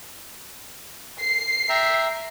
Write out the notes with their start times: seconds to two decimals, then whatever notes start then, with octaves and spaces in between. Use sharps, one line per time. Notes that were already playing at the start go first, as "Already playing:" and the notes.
1.21 C7
1.69 E5 G5 A#5